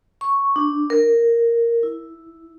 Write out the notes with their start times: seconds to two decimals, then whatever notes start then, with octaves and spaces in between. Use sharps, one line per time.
0.21 C#6
0.56 D4
0.90 A#4
1.83 E4